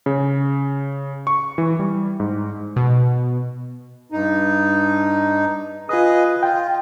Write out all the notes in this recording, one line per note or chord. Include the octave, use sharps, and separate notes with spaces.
C#3
C#6
E3
G3
G#2
B2
G2 D#4
F4 G#4 B4 D#5 D#6
F4 G5